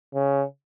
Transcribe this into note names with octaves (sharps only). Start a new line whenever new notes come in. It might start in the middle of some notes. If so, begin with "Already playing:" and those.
C#3